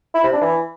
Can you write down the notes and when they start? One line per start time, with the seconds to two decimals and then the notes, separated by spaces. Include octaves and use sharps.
0.15 E4
0.23 C3
0.32 D4
0.41 E3